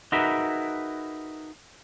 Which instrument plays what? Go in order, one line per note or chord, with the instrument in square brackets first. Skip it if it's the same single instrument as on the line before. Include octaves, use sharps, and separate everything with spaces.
[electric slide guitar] D#4 F#4 G#4 A#4 B4 E5